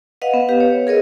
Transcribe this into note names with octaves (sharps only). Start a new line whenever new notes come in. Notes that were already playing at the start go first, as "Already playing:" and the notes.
B4 D#5 F5 F#5
B3
G4 B4 F5
C#5
G#4 A#4 C#5 D#5